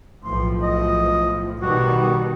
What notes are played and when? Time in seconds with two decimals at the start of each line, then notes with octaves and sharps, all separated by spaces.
0.24 B1 A2 F3 C6
0.62 D#5
1.61 B2 D#3 G3 F#4